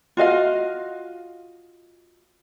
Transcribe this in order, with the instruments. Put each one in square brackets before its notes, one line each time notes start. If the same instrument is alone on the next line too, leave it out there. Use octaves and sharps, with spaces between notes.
[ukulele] F4 F#4 D#5 F5